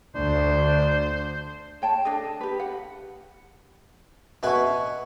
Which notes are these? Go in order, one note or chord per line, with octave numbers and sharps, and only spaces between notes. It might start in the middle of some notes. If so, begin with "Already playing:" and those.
D2 D4 C5
C#5 G5 A5
D4 A4 D#5
G4 B4
F#5
B2 B4 E5 G#5 C#6